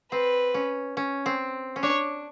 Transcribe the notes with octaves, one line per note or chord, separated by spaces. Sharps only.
C4 B4
C#4
C#4
C4
C#4
D4 C#5